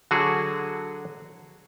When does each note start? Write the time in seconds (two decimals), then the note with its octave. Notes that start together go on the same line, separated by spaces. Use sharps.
0.11 D3 F#3 F#4 G#4